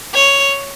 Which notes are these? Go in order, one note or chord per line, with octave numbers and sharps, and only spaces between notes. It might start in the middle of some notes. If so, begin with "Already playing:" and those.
C#5